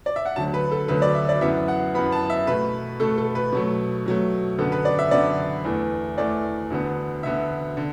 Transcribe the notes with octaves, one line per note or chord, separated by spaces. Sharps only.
D5
E5
F#5
D2 D3 F#3 A5
B4
A4
D2 D3 F#3 B4
D5
E5
D5
F#2 E3 B3 E5
F#5
F#2 E3 B3 B5
A5
E5
B2 A3 B4
B2 A3 A4
A4
B4
B2 F#3 A3
B2 F#3 A3
F#2 D3 B3 A4
B4
D5
E5
F#2 D3 B3 D5
E2 E3 A3
E2 E3 A3 D5
D2 D3 B3
D2 D3 B3 E5
D3